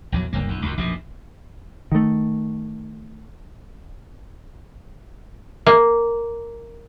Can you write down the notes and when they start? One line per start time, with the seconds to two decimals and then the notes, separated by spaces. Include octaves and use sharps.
0.12 A#1 E2 F#3
0.33 F#1 D2 G2 A#3
0.49 B1 F2
0.62 C#2 F#2
0.78 A#1 F#2 B2
1.92 D#3 A3
5.66 A#3